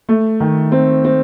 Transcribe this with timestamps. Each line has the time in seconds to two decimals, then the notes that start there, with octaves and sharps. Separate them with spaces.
0.09 A3
0.40 D#3
0.72 C4
1.04 C4